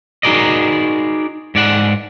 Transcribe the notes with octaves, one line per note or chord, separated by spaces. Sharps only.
D#4 F#4 G#4 A#4 D5 D#5
G#2 D5 F#5